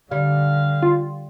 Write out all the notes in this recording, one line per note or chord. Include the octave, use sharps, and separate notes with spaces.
D3 G3 F5
F4